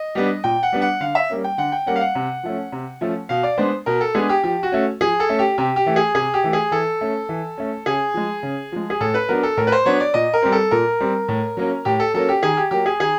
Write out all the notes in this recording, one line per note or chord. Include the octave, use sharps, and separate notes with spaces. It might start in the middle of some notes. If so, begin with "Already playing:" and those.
Already playing: D#5
G3 B3 D4
A#2 G5
F#5
G3 B3 D4
F#5
D3 F5
E5
G3 A#3 C#4
G5
D3 F#5
G5
G3 A#3 C#4 F#5
F5
F#5
C3
F3 A3 C#4
C3
F3 A3 C#4
B2 F5
D5
G#3 B3 D4 C5
B2 A#4
A4
G#3 B3 D4 G#4
G4
F3 G4
F#4
A3 C#4
F3 G#4
A4
A3 C#4
G4
C3 G4
G4
E3 A3
G#4
C3 G#4
G4
E3 A3
G#4
E3 A4
A3 C#4
E3
A3 C#4
C#3 G#4
F3 G#3
C#3
F3 G#3
G#4
A2 A4
B4
F#3 B3 D4 A#4
A4
A2 A#4
B4
C5
F#3 B3 D4 C#5
D5
A#2 D#5
A#4
G3 C4
A4
A#2 A#4
G3 C4
A2
F#3 A#3 C#4
A2 G4
A4
F#3 A#3 C#4 A4
G4
D#3 G#4
G4
F#3 A#3 G4
G#4
D#3 G#4